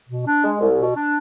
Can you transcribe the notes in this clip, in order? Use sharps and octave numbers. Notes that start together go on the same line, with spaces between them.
B2
D4
G#3
C2
B2
D4